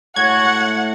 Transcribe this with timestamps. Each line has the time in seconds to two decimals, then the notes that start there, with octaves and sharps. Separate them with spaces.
0.16 A2 F#4 F#5 G#6